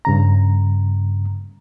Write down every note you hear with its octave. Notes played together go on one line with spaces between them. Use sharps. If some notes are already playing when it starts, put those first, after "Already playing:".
G2 C#3 A#5